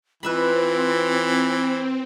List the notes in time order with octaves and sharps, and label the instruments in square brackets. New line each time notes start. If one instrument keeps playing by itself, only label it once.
[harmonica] E3 [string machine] C4 [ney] F4 [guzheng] B4 E5 B5